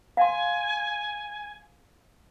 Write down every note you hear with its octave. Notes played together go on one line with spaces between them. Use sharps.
F5 G#5 C6